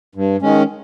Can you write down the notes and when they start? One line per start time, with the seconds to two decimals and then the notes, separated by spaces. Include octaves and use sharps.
0.15 G2
0.42 D#3 G#3 C#4